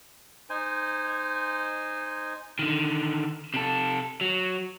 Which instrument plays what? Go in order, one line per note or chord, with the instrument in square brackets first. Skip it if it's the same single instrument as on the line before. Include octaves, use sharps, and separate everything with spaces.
[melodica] D#4 C5 G#5
[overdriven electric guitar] D3 D#3
C3 A4
F#3